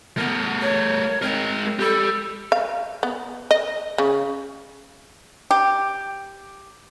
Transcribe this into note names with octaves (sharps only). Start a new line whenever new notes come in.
A3 B3 A#4
C#5
G#3 C4 A#4
G4 A4 B5
F5
B3
D#5
C#3
G4